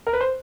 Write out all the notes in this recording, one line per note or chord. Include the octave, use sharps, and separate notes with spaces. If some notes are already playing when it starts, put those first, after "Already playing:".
A#4
B4
C5